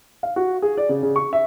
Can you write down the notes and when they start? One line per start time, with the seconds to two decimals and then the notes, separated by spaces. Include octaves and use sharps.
0.23 F5
0.36 F#4
0.62 G#4
0.77 D5
0.89 C#3
1.03 C#3
1.16 C#6
1.33 E5